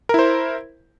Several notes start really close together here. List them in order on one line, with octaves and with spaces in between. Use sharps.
A#4 E4 C5